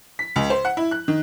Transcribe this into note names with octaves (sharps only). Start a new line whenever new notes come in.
B6
C#2
C5
F#5
E4
F#6
D#3